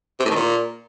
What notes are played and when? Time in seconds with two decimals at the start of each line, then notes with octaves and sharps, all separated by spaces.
0.20 C3
0.25 A2
0.30 D#3
0.36 A#2